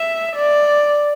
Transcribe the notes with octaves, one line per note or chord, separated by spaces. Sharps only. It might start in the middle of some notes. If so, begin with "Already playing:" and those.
Already playing: E5
D5